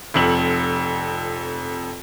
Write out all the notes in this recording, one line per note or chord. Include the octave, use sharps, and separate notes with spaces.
F1 F2 F#7